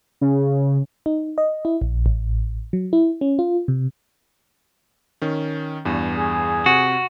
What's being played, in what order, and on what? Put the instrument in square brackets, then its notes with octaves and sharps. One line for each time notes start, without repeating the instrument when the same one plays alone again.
[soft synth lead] C#3
[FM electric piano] D#4
D#5
E4
A#1
A1
F#3
E4
C#4
F4
C3
[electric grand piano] D#3 C#4
E2 G2
[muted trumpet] G#4
[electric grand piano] C3 [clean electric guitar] F#4